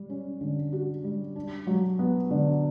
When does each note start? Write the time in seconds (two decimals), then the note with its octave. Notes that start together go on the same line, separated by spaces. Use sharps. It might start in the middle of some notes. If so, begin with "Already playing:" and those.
Already playing: G3
0.10 C#4
0.41 D3
0.73 F#4
1.04 G3
1.36 D4
1.67 F#3
1.99 B3
2.31 D3